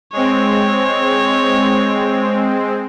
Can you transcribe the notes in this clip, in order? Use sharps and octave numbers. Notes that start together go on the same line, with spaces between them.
G#3 C4 C#5